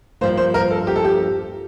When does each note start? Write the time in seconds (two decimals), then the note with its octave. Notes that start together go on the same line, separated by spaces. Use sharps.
0.21 G2 F3 A#3 C5
0.37 C5
0.54 A#4
0.70 A4
0.87 G4
0.96 A4
1.04 G4